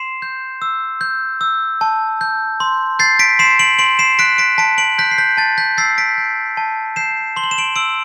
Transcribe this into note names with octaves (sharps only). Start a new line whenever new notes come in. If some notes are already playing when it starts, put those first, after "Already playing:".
Already playing: C6 C7 E7
G6
E6
G6
E6
A5
G6
C6
G6 A6 C7
B6 D7
C6 C7 E7
D7 F#7
C6 D7 F#7
C7 E7
F#6 B6 D7
B6 D7
A5 B6 D7
D7 F#7
F#6 G6 B6
C7
G6 B6
A5 A6
G6 B6
E6 A6 C7
B6 D7
G6
A5
G6 C7 E7
C6 G7
F#7
E7
D7 F#7
E6 D7 F#7